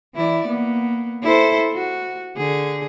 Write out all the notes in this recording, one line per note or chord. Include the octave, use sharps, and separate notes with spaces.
E3 E4 D5
A#3 B3
E4 A4 C5
F#4
D3 G#4